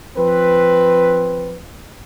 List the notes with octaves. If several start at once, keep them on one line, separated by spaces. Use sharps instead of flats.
F3 C4 B4